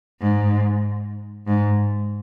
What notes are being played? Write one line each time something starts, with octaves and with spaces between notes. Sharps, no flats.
G#2
G#2